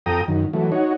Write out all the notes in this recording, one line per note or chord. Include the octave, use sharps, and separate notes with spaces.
F2 A4 G5 A#5 D#6
F#2 D#3
E3 F#3 A3
D#4 F#4 C#5